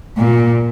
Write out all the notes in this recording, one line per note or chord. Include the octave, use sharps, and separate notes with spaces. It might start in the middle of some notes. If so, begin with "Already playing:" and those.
A#2